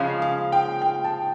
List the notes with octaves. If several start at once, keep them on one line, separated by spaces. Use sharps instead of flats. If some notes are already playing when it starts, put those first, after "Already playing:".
Already playing: C#3 F3 G#3 C#4 F5
F5
G5
G5
A5